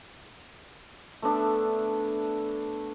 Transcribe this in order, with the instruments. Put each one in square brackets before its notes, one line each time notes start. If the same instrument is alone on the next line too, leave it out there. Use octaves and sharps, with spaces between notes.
[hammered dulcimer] A3 B3 D4 E5